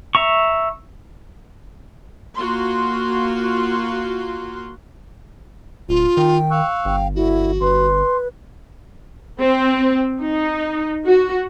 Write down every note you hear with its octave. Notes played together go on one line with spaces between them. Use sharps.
E5 A#5 C#6
A#3 F4 F#4 C6
D1 F4
D#3 G5
F5 C#6 E6 F#6
G1 G5
D3 E4 F#4
G1 B4 C6
C4
D#4
F#4